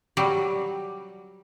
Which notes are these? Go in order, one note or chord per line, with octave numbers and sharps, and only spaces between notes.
F#3 G3